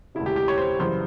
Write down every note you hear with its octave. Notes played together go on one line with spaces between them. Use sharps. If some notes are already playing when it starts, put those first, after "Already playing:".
E1 D2 C#3 E4
G4
G4
C#5
C5
F#2 C#3 E3 G3 C5